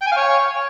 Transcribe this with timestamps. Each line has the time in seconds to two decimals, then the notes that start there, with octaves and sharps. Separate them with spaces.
0.01 G5
0.06 G#5
0.12 F5
0.17 C#5